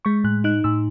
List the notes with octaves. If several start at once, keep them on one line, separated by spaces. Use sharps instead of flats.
G#3 C#6
A2 F#6
D#4 F#6
A2 E6